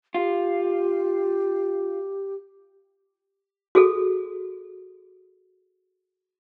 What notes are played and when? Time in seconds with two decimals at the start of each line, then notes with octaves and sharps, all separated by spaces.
0.15 F4 G4
3.75 F#4 G#4 A4